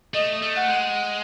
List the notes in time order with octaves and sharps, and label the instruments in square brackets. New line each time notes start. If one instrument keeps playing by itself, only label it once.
[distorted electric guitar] A3 [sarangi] D#5
[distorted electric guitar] A3
[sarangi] F#5
[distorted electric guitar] G#3